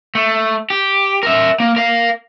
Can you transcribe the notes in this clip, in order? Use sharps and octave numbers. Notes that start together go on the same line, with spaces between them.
A3
G4
A#4 E5
A#3
A#4 F5